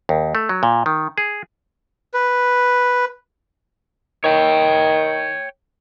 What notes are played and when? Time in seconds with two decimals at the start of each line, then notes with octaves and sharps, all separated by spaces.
0.09 D#2
0.35 A3
0.49 F#3
0.63 A#2
0.86 D#3
1.18 G#4
2.14 B4
4.24 D#3 C#5 G5